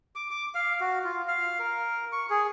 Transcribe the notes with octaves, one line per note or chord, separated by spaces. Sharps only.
D6
D6
F5
F#4
F4
F5
A#4
C#6
G#4